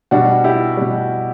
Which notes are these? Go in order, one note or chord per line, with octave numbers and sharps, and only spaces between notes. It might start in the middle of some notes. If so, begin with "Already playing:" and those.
B2 G3 D4 F#4
E4 G4
B2 G3